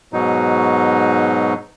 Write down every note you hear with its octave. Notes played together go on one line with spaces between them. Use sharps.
G#2 B2 F#3 D#4